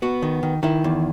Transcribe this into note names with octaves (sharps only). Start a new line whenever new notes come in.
B3 F#4
D#3
D#3
D#3 E4
E2